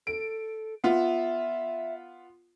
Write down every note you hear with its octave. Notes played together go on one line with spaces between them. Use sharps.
A4 D7
B3 F4 E5